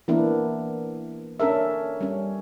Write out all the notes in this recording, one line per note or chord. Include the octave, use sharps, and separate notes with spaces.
E3 A#3 B3 D4 E4 A#4
C#4 D4 A4 A#4 E5
G3 C#4